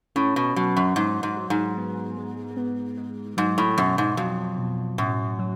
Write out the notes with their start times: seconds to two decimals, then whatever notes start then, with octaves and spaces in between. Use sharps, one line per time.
0.16 A2 C#4
0.36 B2
0.56 B2 F#3
0.77 F#2
0.96 G#2 F#3
1.23 G#2
1.37 F#3
1.50 G#2
1.77 B3
2.17 G#3
2.57 B3
2.97 G#3
3.37 G#2 F#3
3.58 A2
3.77 F#2 B2
3.98 G#2
4.17 F2 F#3
4.58 B2
4.98 F#2 A2
5.39 F#3